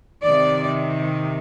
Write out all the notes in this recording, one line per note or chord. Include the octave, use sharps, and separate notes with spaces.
C3 D#3 D5